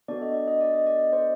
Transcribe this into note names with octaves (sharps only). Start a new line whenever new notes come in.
B3 D4 F#4 A4 D5
D#5
D5
D#5
D5
D#5
D5
D#5
C5 D5